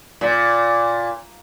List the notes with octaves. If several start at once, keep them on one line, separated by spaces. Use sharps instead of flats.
A#2